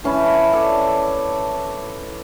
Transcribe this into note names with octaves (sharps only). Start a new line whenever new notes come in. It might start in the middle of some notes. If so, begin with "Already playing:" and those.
E3 C#4 A5 B5
A4 C#5 D5